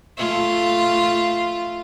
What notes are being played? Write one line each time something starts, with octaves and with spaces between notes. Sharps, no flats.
A3 F4